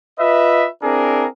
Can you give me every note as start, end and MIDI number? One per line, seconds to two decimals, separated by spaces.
0.19 0.67 65
0.19 0.67 71
0.19 0.67 75
0.19 0.67 76
0.83 1.26 60
0.83 1.26 62
0.83 1.26 64
0.83 1.26 68
0.83 1.26 70